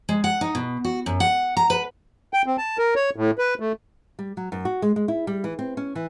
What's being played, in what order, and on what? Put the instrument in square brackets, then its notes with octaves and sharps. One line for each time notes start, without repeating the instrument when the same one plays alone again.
[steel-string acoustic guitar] G#3
F#5
D#4
B2
F#4
F#2
F#5
A#5
B4
[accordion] G5
C4
A5
A#4
C#5
A2
B4
A3
[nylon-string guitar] G3
F#3
F#2
F#4
G#3
G#3
E4
G3
E3
C4
C#4
E3